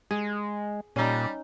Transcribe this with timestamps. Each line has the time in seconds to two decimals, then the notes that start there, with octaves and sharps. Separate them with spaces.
0.11 G#3 G#4
0.96 A#2 G3 C#4 D#4